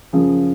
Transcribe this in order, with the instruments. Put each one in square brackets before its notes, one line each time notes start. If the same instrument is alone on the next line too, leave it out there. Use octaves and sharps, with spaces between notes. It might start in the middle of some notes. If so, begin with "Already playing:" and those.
[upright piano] F#2 C#3 F3 G#4